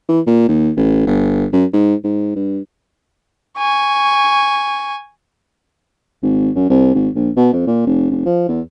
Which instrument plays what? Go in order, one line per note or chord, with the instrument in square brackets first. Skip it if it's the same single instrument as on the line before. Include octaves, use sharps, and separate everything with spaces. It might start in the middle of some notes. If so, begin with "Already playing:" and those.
[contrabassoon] E3
A#2
D#2
A1
G1
F#2
G#2
G#2
G2
[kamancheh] G#5 C#6
[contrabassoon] G#1
F#2
C2
G#1
A#1
B2
F2
A#2
F1
F1
F3
E2